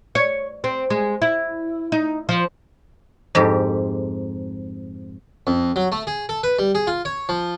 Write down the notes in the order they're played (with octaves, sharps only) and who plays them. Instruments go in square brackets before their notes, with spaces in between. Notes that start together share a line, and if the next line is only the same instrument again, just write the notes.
[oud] C#5
C4
G#3
E4
D#4
F3
[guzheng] F2 G#2 G4
[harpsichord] F2
F#3
A3
G#4
A4
B4
G3
G#4
F4
C#5
F3